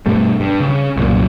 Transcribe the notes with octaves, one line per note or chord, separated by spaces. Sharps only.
G2 B2 G3 A3
G2
C#3
C2 F#2 A#2